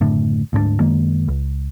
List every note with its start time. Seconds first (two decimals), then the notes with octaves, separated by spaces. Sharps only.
0.01 F#1 A2 D3
0.53 D2 G#2 G#3 D4
0.80 F#2 D#3 G#3 A#3
1.28 C#2